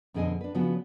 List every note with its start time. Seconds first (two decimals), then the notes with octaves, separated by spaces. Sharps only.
0.14 F2 B2 D3 G#4 D#5 G#5
0.41 D4 B4
0.55 C#3 F3 B3 D4 F#4